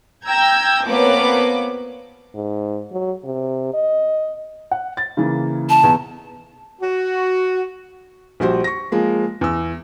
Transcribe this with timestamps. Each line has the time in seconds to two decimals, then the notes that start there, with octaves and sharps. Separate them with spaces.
0.25 G5 A#5 E6 G6 G#6
0.85 F2 A#3 B3 B4 C#5 D6
2.35 G#2
2.92 F#3
3.24 C3
3.74 D#5
4.71 F#5
4.97 A6
5.17 C#3 E3 A#3
5.69 A5
5.82 B1 E2
6.82 F#4
8.40 A#1 G3 F#4 C5
8.64 C#6 A#6
8.92 F3 G#3 A#3
9.41 E2 E6